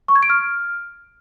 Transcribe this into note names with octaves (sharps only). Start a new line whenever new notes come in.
C#6
G#6
D7
F6